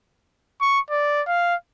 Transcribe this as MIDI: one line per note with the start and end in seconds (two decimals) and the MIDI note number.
0.61 0.80 85
0.90 1.22 74
1.27 1.55 77